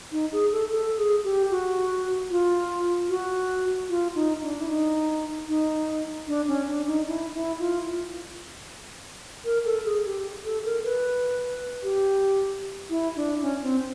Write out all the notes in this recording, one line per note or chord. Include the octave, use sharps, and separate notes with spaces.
D#4
G#4
A4
A4
G#4
G4
F#4
F4
F#4
F4
D#4
D4
E4
D#4
D#4
D4
C#4
D4
D#4
E4
E4
F4
A#4
A4
G#4
G4
A4
A#4
B4
G4
E4
D4
C#4
C4